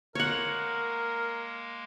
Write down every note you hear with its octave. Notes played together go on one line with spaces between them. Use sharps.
G#3 A#3 A#4 C#5 F#5